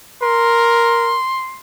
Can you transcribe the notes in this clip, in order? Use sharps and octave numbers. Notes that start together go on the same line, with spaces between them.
A#4 C6